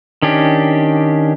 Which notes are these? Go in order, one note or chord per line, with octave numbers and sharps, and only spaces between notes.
D#3 C#4 D4 G4